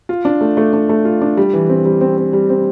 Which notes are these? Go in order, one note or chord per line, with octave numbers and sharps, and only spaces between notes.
F4
D4
A3
A3
D4
A3
F4
D4
G3
E3
C4
G3
C4
C4
G3
C4